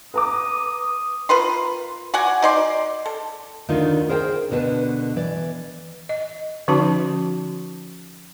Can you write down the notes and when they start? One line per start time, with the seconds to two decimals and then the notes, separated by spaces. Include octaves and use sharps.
0.14 B4 A#5 D6 D#6
1.29 F4 A#4 B4 C6
2.14 F#4 D5 F#5 G#5
2.42 D#4 D5 C6
3.06 A4
3.69 D2 D3 D#3 A3 D#4 F4
4.09 G#4 A#4 C5 C#5 F#5 G5
4.50 D2 B2 D3 F#4 B4 A5
5.16 E3 D5
6.09 D#5
6.68 D3 F3 C#4 D#4 F#4 A5